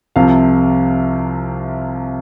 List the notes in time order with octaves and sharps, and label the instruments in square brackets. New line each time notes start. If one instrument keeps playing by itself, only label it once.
[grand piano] C2 C3 F3 F5